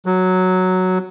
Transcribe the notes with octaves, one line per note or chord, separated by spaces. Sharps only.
F#3